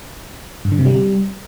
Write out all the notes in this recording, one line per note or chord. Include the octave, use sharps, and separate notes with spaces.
G2
D3
C3
G3